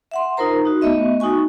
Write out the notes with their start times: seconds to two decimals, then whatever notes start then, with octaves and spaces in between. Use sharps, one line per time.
0.11 E5 F#5 C6
0.37 D#4 F4 A#4 C5 A#5
0.65 D#4 F#4
0.82 A3 B3 D#5 E5
1.20 D#4 F#4 G#5 C#6